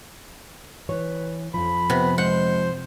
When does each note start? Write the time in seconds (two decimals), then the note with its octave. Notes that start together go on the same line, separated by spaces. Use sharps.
0.89 E3 B4 C#5
1.54 F2 G#2 F3 B5
1.90 C3 B3
2.18 G#3 C5 F#5